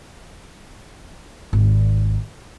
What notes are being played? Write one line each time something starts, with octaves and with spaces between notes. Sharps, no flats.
G#1 D#2